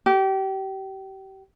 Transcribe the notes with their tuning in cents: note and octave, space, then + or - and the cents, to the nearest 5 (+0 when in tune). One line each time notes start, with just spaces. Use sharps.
G4 -30